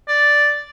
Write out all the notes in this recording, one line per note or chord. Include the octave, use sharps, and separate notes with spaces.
D5